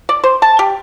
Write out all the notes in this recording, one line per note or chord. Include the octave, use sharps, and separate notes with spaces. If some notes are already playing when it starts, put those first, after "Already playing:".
D5
C5
A5
G4